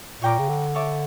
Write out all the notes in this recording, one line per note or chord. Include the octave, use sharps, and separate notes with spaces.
A#2 C#5 G5 A#5 D6
C#3
D3
C#5 E5 A5 D6